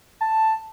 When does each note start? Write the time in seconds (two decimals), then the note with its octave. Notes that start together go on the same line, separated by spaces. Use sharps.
0.21 A5